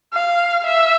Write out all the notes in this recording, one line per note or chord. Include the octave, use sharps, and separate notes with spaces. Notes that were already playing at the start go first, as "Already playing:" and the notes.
F5
E5